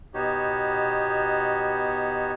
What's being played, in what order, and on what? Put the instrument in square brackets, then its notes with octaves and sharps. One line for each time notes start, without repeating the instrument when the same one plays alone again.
[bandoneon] B2 B3 D#4 F#4 G4 C#5